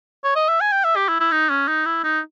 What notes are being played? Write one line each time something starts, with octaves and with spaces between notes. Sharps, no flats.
C#5
D#5
E5
G#5
G5
E5
G4
E4
E4
D#4
C#4
D#4
E4
D#4